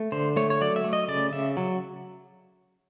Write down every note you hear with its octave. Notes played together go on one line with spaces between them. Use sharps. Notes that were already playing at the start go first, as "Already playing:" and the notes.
Already playing: A3
D3 C5
A3 C#5
C#5
F#3 D5
E5
A3
D#5
C#3 D5
C#3 E5
F#3